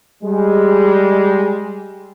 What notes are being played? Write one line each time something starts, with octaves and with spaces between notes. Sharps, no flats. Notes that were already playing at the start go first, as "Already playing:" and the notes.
G3 G#3